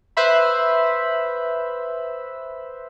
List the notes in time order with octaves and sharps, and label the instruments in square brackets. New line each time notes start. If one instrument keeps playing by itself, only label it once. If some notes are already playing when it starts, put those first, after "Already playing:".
[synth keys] B4 C5 E5 B5